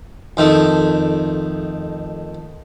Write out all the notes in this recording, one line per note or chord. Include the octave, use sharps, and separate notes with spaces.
F2 D#3 A3